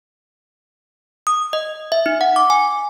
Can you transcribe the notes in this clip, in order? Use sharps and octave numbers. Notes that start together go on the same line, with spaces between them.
D#6
D#5
E5
D#4
F#5
D6
G#5